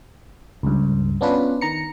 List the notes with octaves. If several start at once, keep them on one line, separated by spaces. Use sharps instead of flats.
C#2 G2
B3 C#4 D4 F4 B4
D#3 A#5 C#7